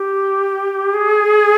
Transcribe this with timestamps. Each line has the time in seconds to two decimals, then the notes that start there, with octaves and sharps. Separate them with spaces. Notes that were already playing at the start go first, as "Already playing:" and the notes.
Already playing: G4
0.94 G#4